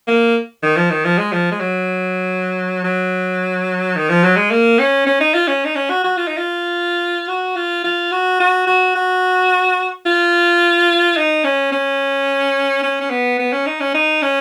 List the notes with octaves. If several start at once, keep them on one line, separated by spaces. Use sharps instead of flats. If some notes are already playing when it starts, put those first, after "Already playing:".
A#3
D#3
F3
D#3
F3
G#3
F3
G#3
F#3
F#3
D#3
F3
F#3
G#3
A#3
C#4
C#4
D#4
F4
C#4
D#4
C#4
F#4
F#4
F4
D#4
F4
F#4
F4
F4
F#4
F#4
F#4
F#4
F4
D#4
C#4
C#4
C#4
C#4
B3
B3
C#4
D#4
C#4
D#4
C#4